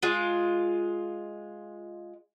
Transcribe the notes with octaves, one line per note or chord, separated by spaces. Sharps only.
G#3 F4